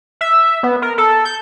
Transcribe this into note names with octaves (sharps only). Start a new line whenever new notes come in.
E5
B3
A#4
A4
G6